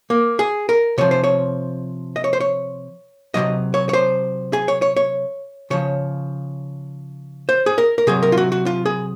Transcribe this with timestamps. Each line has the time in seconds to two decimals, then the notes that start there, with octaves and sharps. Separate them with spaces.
0.10 A#3
0.39 G#4
0.69 A#4
0.98 C3 F3 C#5
1.11 C5
1.24 C#5
2.16 D#5
2.24 C#5
2.33 C5
2.40 C#5
3.34 C3 D#3 F#3 D#5
3.74 C#5
3.89 C#5
3.93 C5
4.53 G#4
4.68 C#5
4.82 C#5
4.96 C#5
5.70 C#3 F3 C#5
7.49 C5
7.66 G#4
7.78 A#4
7.98 A#4
8.07 C3 F#3 G#4
8.23 A#4
8.32 F4
8.37 F#4
8.52 F#4
8.66 F4
8.86 G#4